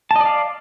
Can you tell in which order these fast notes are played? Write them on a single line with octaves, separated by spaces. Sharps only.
A5 D#5 D5 F5